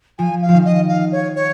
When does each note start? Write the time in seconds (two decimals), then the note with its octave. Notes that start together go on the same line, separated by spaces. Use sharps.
0.19 F3 G#5
0.42 F5
0.49 F3
0.54 D#3
0.65 D#5
0.89 F5
1.12 C#5
1.35 C#5